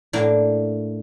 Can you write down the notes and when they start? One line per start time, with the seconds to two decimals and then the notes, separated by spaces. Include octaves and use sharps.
0.13 A2 A#3 D4